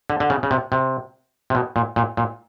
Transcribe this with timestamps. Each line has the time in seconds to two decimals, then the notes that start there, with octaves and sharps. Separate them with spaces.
0.10 D3
0.20 D3
0.30 C#3
0.43 C#3
0.51 C3
0.72 C3
1.50 C3
1.55 B2
1.76 A#2
1.96 A#2
2.17 A#2